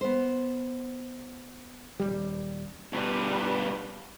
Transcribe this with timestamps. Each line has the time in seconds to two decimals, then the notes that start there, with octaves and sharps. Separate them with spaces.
0.01 B3 C5
2.00 D#1 G#1 G3
2.93 G2 B2 G3 B4